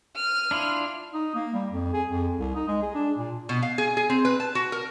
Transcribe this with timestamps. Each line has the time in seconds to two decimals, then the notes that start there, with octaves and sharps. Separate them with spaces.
0.16 F6 D#7
0.51 D4 E4 F4
1.14 D#4
1.35 A#3
1.54 G3
1.72 F2
1.93 G#4
2.09 F2
2.39 C2
2.55 D#4
2.68 G#3
2.82 G#4
2.95 D4
3.18 A#2
3.49 B2
3.63 F5
3.78 G#4
3.97 G#4
4.10 C4
4.25 B4
4.40 A5
4.55 F#4
4.72 A#4